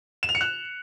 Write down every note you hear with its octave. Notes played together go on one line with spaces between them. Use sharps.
E7
F7
C#7
F#6